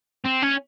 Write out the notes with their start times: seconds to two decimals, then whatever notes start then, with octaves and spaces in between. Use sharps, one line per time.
0.25 C4
0.42 C#4